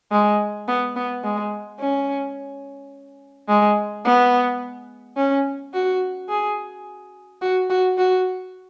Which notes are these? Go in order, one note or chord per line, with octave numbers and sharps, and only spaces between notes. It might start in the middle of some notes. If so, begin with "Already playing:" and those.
G#3
B3
B3
G#3
C#4
G#3
B3
C#4
F#4
G#4
F#4
F#4
F#4